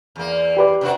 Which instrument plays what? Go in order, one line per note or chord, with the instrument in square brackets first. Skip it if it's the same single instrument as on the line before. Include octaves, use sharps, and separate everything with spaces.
[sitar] E2 A#3
[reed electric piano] G4 B4 D5
[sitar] C3 D4 F#4